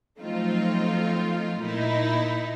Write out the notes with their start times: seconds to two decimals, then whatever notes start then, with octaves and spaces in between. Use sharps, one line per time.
0.19 F3 F#3 A3 C4 D#4 F4
1.61 A#2 D#4 E4